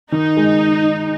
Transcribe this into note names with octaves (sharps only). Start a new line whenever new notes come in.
D#3 D#4
G#3